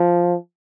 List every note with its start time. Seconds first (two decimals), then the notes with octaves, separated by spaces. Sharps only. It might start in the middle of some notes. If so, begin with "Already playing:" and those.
Already playing: F3